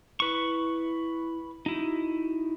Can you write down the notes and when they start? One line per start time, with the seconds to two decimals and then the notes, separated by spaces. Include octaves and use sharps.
0.20 E4 B4 C#6
1.66 D#4 E4 F#4